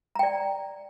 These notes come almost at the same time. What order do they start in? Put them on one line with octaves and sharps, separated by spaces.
A#5 G5 D5